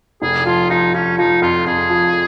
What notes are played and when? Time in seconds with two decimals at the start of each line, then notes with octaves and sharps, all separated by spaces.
0.22 F1 G#4
0.46 F3 F4
0.70 F3 D#4
0.94 F3 C#4
1.18 F3 D#4
1.42 F2 F4
1.66 F2 G#4
1.90 F3